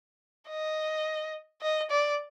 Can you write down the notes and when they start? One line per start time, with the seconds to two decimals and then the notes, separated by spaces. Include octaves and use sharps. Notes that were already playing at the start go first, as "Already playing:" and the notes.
0.49 D#5
1.61 D#5
1.90 D5